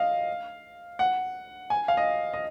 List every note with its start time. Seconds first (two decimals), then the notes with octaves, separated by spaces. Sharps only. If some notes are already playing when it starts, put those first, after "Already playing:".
Already playing: D#5 F5
0.99 F#5
1.70 G#5
1.88 F5
1.97 D#5
2.33 D#5